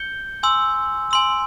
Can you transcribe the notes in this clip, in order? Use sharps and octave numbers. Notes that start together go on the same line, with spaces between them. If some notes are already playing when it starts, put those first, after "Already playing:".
Already playing: G6 C#7 G7
G#5 C6 E6
G#5 C6 E6